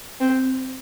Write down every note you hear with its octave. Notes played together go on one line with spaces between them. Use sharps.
C4